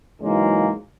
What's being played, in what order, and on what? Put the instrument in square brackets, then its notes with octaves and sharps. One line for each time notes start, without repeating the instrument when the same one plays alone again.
[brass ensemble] G#2 C#3 E3 F#3 G#3 A#3